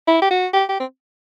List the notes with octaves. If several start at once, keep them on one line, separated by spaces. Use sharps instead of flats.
E4
G4
F#4
G4
G4
C4